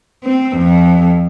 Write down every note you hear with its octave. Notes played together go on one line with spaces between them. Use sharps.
C4
F2